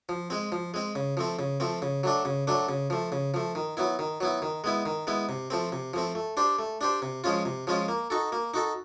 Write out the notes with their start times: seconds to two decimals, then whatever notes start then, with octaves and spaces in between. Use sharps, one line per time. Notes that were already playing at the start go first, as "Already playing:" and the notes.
0.09 F3
0.30 G#3 C4
0.52 F3
0.74 G#3 C4
0.95 C#3
1.17 F3 A3 C4
1.39 C#3
1.60 F3 A3 C4
1.82 C#3
2.03 F#3 A3 D4
2.25 C#3
2.47 F#3 A3 D4
2.69 C#3
2.90 F3 A3
3.12 C#3
3.34 F3 A3
3.55 D#3
3.77 F#3 B3 E4
3.99 D#3
4.21 F#3 B3 E4
4.42 D#3
4.64 G#3 B3 E4
4.86 D#3
5.07 G#3 B3 E4
5.29 C3
5.50 F3 A3 C4
5.72 C3
5.94 F3 A3 C4
6.15 A3
6.37 D4 G4 C5
6.59 A3
6.81 D4 G4 C5
7.02 C3
7.24 F3 G#3 C#4 F4
7.45 C3
7.67 F3 G#3 C#4 F4
7.88 A#3
8.10 D#4 F#4 A4
8.32 A#3
8.54 D#4 F#4 A4